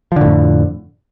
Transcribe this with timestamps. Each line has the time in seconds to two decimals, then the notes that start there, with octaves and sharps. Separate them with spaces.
0.12 F3
0.16 D3
0.21 A2
0.26 F2